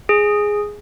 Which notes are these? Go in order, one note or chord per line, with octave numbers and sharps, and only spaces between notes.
G#4